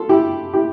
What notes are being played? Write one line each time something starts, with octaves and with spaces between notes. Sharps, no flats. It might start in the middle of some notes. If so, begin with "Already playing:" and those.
Already playing: F4 A4
E4 G4
E4 G4